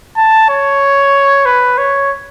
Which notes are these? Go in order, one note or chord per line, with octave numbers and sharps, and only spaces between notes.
A5
C#5
B4
C#5